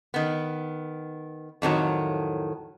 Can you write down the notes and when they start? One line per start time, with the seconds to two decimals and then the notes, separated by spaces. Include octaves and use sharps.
0.14 D#3 B3
1.62 F2 A2 D#3 F#3